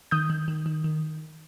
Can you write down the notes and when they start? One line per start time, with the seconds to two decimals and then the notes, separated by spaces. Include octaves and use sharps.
0.11 D#3 D#6 G6
0.30 D#3
0.48 D#3
0.66 D#3
0.84 D#3